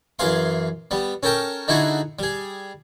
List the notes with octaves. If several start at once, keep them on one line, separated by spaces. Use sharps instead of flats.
F#2 E3 G#4 F5 C6
G3 B3
C#4 A4 A#4 G5 A5
D3 D#4 E4 F#4 G#4 A4
G3 G#4